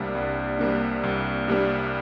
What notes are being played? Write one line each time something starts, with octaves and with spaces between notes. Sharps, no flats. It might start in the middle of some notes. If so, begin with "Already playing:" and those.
Already playing: C2 C3 G3 A#3 D4
C2
C3 G3 A#3 D4
C2
C3 G3 A#3 D4